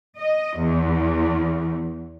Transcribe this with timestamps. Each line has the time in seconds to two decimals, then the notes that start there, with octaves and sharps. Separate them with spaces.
0.18 D#5
0.58 E2